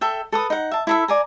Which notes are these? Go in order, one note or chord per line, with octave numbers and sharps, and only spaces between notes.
A4 E5 G5
A4 B4 D#6
D#4 F#5
E5 A5
E4 A4 E5
D5 G#5 A#5